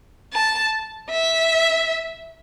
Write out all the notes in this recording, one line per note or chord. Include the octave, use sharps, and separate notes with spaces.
A5
E5